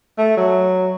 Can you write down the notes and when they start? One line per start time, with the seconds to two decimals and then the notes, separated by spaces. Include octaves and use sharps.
0.18 A3
0.37 F#3